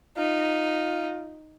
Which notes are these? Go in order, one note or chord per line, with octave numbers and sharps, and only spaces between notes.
D#4 F4